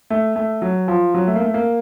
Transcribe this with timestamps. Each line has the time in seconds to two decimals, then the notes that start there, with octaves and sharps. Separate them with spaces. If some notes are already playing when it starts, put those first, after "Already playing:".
0.10 A3
0.36 A3
0.62 F#3
0.88 F3
1.14 F#3
1.27 A3
1.36 A#3
1.41 A3
1.54 A#3